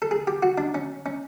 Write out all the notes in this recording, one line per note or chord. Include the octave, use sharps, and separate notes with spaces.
A4
G#4
G4
F#4
D4
C#4
C#4